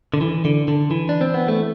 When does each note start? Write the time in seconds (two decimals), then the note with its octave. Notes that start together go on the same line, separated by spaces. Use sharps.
0.14 D3
0.21 E3
0.45 D3
0.68 D3
0.91 E3
1.09 D4
1.21 C4
1.34 B3
1.48 A3